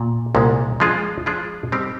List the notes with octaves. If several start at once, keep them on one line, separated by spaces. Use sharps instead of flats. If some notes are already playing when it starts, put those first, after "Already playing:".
Already playing: A#2
C2 A#2 G#3
F3 G#3 D4 F4 G#4
F3 G#3 D4 F4 G#4
G3 C4 D#4 G4